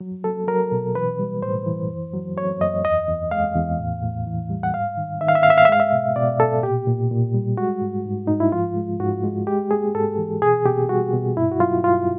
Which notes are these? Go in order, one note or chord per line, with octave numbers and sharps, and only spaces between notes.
F#3
F#3 A4
F#3 A#4
B2
E3 B4
G3
A2 C5
E3
F#2
F#3
F#3 C#5
F#2 D#5
E2 D#5
E2
G#3 F5
E2
A2
A2
E3
G3
F#5
G#2 F5
D#3
D#3 E5
F5
E5
G#2 F5
E5
F5
E5
G#3 F5
E5
B2
B2 D5
B2 A4
A#2 G4
A#2
A#2
G3
G#3 F#4
G#2
G#2
G#2 D#4
E4
F3 F4
G#3
G#2 F#4
G#3
G#3 G4
G#3 G#4
G#2 A4
E3
B2 G#4
B2 G4
G3 F#4
B2
G2 E4
F#4
F#3 F4
G2 F4